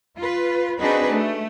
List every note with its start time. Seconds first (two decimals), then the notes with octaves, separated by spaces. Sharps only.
0.18 F4 B4
0.80 C4 D4 D#4 F#4 G#4 B4
1.12 A3